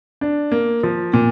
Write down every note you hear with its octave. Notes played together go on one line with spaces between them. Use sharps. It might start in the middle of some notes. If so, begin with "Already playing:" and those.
D4
A#3
F3
A#2